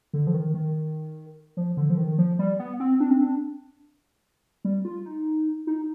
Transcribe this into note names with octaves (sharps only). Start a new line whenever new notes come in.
D3
F3
D#3
D#3
F3
D3
F3
D#3
F3
G3
B3
C4
D4
C4
D4
G3
F4
D#4
D#4